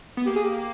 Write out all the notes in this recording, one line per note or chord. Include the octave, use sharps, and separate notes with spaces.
B3
A#3 G4
G#4
G4